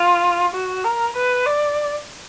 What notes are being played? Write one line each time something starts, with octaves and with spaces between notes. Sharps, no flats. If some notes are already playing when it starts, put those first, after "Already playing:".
Already playing: F4
F#4
A#4
B4
D5